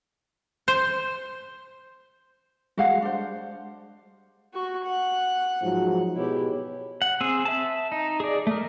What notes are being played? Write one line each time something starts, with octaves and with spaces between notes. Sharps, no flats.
C5
G3 G#3 F#4 F5 F#5
D4 C5
F#4 C#6
F#5
G#2 F3 F#3
B2 E4 G4 G#4 C#5
F#5
C4 G#4 E6
E5 A5
D#4
G#4 D5
A3 A#4